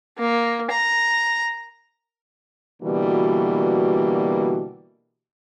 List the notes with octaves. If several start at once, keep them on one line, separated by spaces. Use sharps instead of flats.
A#3
A#5
B2 D3 E3 G3 A#3 F#4